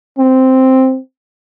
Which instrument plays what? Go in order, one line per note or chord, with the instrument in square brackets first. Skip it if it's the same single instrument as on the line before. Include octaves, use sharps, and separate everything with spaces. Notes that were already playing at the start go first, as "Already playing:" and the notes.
[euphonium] C4